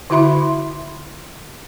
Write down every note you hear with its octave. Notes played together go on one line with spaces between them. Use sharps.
D3 E4 F#4 E5 B5 C6